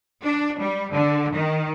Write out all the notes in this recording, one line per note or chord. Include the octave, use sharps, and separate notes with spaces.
D4
G3
D3
D#3